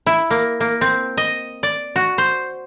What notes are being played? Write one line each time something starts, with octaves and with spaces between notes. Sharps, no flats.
E4
A#3
A#3
C4
D#5
D5
F#4
C5